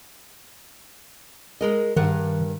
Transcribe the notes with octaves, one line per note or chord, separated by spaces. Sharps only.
G#3 A#4 D#5
G2 D#3 A#4 F#5